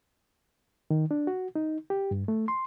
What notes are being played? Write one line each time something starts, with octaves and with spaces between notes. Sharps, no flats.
D#3
D4
F#4
D#4
G4
G2
A3
C6